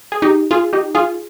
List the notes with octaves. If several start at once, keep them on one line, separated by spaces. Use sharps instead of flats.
G#4
D#4 G4
F4 G#4
D#4 G4
F4 G#4